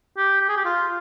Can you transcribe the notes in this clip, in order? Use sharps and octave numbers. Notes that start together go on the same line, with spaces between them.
G4
G4
G#4
G4
F4